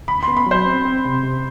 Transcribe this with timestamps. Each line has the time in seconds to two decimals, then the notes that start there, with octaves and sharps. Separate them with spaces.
0.08 D2 B5
0.23 C6
0.28 B3
0.37 B5
0.47 F#3 C5
0.66 C4
0.85 C4
1.05 C3
1.24 C3